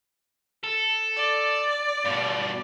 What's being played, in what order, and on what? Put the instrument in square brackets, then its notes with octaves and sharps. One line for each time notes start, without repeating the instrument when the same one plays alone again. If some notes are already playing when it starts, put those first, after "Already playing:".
[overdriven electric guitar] A4
[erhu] D5
[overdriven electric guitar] G2 B2